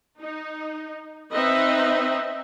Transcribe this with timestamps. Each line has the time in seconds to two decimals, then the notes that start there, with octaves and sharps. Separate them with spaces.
0.20 D#4
1.32 C4 D#4 B4 D#5 E5